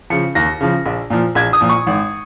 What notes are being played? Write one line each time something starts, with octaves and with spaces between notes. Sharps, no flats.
C#3 F3 C#7
D#2 A#6
C#3 F3
A#1
A#2 F3
A#1 G#6
D#6
A#2 F3
C#6
G#1